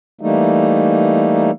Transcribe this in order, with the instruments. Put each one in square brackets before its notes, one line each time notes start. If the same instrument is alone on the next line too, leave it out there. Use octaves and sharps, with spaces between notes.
[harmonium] E3 G3 A3 A#3 D#4